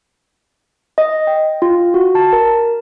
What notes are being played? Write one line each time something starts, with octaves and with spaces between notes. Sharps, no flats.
D#5
G5
F4
F#4
A5
A#4